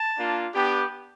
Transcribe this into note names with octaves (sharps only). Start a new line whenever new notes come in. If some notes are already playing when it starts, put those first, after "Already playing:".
Already playing: A5
A#3 D4 F4
B3 D4 G4